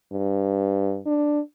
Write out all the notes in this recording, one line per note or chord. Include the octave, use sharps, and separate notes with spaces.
G2
D4